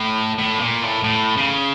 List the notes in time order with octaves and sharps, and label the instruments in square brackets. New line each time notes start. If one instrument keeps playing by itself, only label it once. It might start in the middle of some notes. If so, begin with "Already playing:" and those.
Already playing: [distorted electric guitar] A2
A2
A#2
A2
A2
C#3